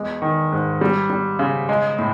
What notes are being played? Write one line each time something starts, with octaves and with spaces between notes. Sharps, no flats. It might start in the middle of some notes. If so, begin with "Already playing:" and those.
Already playing: E2 G#3
D#3
G#2
G3
G3
C#3
G#3
A2